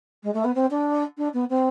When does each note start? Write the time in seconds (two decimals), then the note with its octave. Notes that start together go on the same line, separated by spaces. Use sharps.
0.23 G#3
0.34 A3
0.44 B3
0.55 C4
0.70 D4
1.17 D4
1.33 B3
1.49 C4